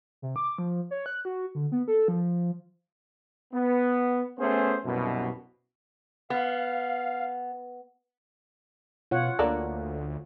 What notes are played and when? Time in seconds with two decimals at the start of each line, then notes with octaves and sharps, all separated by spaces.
0.22 C3
0.36 D6
0.58 F3
0.91 C#5
1.06 F#6
1.25 F#4
1.55 D3
1.72 B3
1.88 A4
2.08 F3
3.53 B3
4.39 A3 B3 C#4 G#4 C5
4.84 C2 F#2 B2
6.30 B3 F5
9.11 B2 F4 C#5 F#5
9.39 D2 D3 A#3 D4